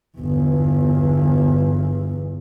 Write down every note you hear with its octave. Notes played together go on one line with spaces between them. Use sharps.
G1 E2